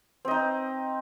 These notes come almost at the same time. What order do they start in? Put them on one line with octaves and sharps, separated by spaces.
C4 D#5 D#4